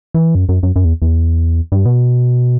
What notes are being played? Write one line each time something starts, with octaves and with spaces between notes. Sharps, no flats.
E3
F#2
F#2
F#2
F#2
E2
E2
G2
B2